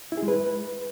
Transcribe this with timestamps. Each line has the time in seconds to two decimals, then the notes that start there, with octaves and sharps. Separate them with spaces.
0.12 E4
0.17 G#4
0.23 G#3
0.28 B4